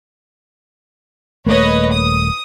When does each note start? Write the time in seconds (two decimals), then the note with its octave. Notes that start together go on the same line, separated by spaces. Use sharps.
1.46 D#1 A3 A#3 B4 C#5 D#5
1.91 D#6